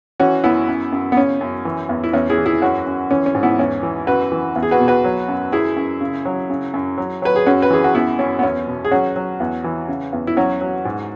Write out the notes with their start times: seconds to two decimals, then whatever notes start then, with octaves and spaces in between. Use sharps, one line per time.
0.20 E3 C#4 F#4
0.44 F#2 B3 E4
0.68 F#2
0.92 F#2
1.12 B3
1.17 C#3 C#4
1.41 F#2
1.65 E3
1.89 E2
2.04 E4
2.13 E2 C#4
2.29 E4 G#4
2.38 E3
2.46 E4 G#4
2.62 F#2 C#4 F#4
2.86 F#2
3.11 E3 C#4
3.26 C#4
3.35 G#2
3.43 B3 E4
3.59 E2 C#4
3.83 E3
4.07 F#2 F#4 B4
4.32 E3
4.56 E2
4.63 G#4
4.71 F#4 B4
4.80 B2
4.88 F#4 B4
5.04 F#3
5.28 F#2
5.52 F#2 E4 G#4
5.77 F#2
6.01 C#3
6.25 F#3
6.50 C#3
6.74 F#2
6.98 F#3
7.22 F#3 B4
7.36 G#4
7.46 F#2 C#4 F#4
7.62 B4
7.70 E3 G#4
7.84 F#4
7.95 F#2 B3 E4
8.19 F#2 C#4
8.39 B3
8.43 E2 C#4
8.67 B2
8.85 G#4
8.91 F#3 C#4 F#4
9.16 F#3
9.40 E2
9.64 E3
9.88 C#3
10.13 E2
10.27 E4
10.37 F#3 C#4 F#4
10.61 F#3
10.85 G#2